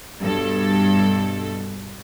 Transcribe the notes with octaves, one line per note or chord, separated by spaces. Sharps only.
G2 B2 A4